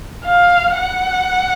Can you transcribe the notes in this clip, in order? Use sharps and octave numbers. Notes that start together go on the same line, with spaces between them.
F5
F#5